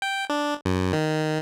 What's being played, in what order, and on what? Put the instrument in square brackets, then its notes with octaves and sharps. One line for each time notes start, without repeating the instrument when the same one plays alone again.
[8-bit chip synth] G5
D4
F#2
D#3